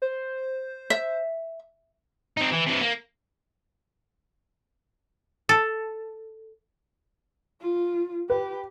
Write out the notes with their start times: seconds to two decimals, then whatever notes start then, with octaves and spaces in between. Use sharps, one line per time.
0.02 C5
0.90 E5
2.37 C4 D#4
2.51 E3
2.66 C3 E3
2.81 A#3
5.49 A4
7.61 F4
8.30 G4 B4